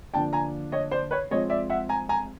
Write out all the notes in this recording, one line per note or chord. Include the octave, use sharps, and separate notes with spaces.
D3 F3 A#3 D4 G5 A5
G#5 A#5
C#5 D#5
C5 D5
B4 C#5
F3 G#3 C4 C#5 D#5
D5 E5
E5 F#5
G#5 A#5
G#5 A#5